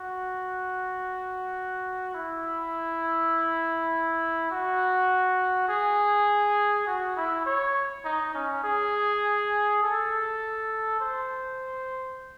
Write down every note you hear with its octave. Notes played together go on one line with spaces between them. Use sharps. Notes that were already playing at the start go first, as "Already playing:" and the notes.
Already playing: F#4
E4
F#4
G#4
F#4
E4
C#5
D#4
C#4
G#4
A4
C5